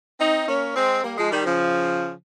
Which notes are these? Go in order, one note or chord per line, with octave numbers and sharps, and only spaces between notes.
C4 D#4
A#3 C#4
G#3 C4
G3 A#3
F3 G#3
D#3 G3
C#3 F3